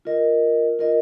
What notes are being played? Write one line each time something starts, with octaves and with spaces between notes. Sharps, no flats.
F4 A#4 D#5
F4 A#4 D#5